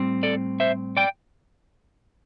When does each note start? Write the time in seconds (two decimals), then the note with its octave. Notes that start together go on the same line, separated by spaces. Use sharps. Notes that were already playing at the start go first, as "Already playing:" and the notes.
Already playing: A2 G3 C4
0.23 A4 D5
0.60 C5 E5
0.97 D5 G5